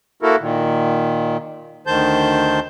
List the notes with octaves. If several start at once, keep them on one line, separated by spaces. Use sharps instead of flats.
A#3 E4 F#4 A4 A#4
A#2 D#3
D2 D#3 C5 A5 G6